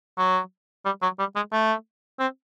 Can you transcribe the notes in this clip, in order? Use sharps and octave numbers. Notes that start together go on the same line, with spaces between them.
F#3
G3
F#3
G3
G#3
A3
C4